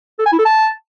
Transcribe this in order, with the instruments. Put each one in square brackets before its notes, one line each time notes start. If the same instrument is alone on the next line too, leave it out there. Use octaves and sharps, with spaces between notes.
[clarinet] A4
G#5
E4
A4
A5